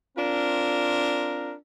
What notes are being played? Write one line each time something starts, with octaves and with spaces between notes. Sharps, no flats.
C4 D4 F4 A#4